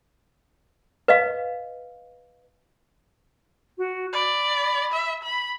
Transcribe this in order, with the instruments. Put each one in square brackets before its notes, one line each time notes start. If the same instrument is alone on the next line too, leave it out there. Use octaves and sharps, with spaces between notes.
[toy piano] B4 D#5 F5
[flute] F#4
[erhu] D5 [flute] B5
[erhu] E5
B5